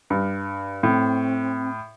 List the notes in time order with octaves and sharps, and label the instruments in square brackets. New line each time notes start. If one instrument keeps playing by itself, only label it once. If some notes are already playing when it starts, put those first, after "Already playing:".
[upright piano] G2
[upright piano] A2 [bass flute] C4